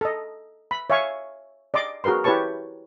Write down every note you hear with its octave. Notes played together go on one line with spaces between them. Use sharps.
A4 D#5
B5
C#5 E5 F5 G#5 C#6
D5 D#5 C6 D6
F#4 G#4 A#4 B4 C6
E4 G4 B4 C#5 A5 C#6